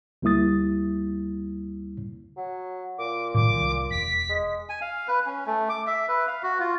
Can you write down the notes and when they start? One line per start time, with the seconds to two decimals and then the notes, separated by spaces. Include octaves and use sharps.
0.22 D2 G3 A#3 E4 D#6 A6
2.37 F#3
2.98 A#2 D6
3.34 A2 D#3 F#3 D6
3.53 C2 D#3
3.91 E1 B6
4.29 G#3
4.69 G#5
4.81 F5
5.08 B4
5.26 C#4
5.46 A3
5.69 D6
5.87 E5
6.08 B4
6.27 F5
6.43 F#4
6.60 F4